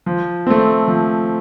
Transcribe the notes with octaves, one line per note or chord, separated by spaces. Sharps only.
F3
A3 C4
F3